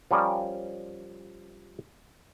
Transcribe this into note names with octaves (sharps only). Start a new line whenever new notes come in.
F3 G3 C#4 A#4 D5